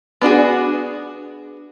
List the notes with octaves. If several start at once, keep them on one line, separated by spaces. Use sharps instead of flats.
B3 D4 F#4 G#4